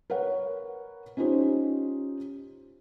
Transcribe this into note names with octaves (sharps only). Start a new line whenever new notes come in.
A#4 B4 C#5 F#5
C#4 D#4 F4 G4 C5